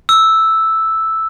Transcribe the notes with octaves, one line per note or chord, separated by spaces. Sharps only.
E6